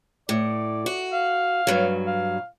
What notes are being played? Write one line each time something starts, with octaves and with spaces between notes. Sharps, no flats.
A2 D5
F#4
F5
G2 F#3
F5